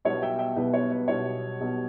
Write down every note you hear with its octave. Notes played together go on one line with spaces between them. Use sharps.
B1 B2 G3 B3 C#5
E5 G5
E5 G5
B1 B2 G3 B3 B4
C#5
B4
B1 B2 G3 B3 C#5
B1 B2 G3 B3